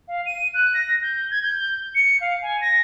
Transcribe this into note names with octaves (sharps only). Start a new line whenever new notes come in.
F5
D#7
F#6
A#6
G6
G#6
G6
C#7
F5
G#5
A#6